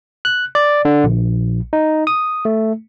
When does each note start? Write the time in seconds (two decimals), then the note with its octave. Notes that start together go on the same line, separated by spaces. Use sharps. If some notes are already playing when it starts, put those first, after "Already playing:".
0.25 F#6
0.55 D5
0.85 D3
1.04 A#1
1.73 D#4
2.07 D#6
2.45 A3